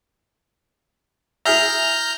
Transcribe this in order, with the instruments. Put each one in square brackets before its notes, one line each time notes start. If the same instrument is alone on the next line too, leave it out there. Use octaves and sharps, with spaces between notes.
[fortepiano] E4 G#4 E5 [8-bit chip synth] A#5 F6 G6